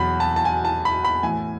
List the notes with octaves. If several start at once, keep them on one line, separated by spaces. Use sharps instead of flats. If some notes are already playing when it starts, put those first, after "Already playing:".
Already playing: E2 B2 F#3 B5
A5
A5
G#5
A5
B5
B5
A2 E3 G#5